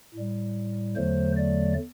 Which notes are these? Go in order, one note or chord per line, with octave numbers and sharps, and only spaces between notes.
A2 G3
E2 D3 F#3 A3 C5
D5